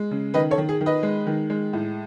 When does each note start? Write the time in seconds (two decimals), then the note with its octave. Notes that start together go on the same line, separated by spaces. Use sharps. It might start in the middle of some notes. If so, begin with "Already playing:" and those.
Already playing: G#3
0.11 C#3
0.34 D#3 B4 D#5
0.51 A4 C#5
0.58 D#3
0.69 G#4
0.81 D#3
0.86 B4 D#5
1.03 G#3
1.27 D#3
1.50 G#3
1.73 A2